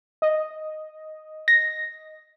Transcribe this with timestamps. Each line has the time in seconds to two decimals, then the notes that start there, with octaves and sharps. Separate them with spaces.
0.22 D#5
1.48 A#6